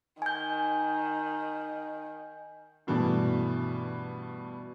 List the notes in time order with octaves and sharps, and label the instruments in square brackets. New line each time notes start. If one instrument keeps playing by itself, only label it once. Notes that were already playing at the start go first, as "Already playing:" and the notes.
[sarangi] D#3 [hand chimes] G#5 G6
[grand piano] G2 B2 E3 A3 D4